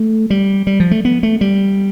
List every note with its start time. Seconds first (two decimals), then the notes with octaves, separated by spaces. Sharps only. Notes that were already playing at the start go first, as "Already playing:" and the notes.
Already playing: A3
0.30 G3
0.67 G3
0.80 F3
0.91 A3
1.05 B3
1.23 A3
1.41 G3